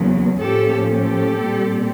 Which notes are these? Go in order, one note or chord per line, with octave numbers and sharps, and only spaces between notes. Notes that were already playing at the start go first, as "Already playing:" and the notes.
Already playing: E2 C#3 F#3 A#3
A2 F3 A#3 C#4 G4 A4
G4 A4
A#2 G3 C4